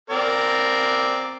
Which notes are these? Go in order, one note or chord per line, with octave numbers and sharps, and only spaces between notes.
C4 A#4 D5